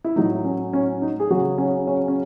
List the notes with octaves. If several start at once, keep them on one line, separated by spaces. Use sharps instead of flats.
E4
A2 F#3 D#4
C#4
C#4
D#4
G#4
C#3 F#3 F#4
C#4
C#4
C#4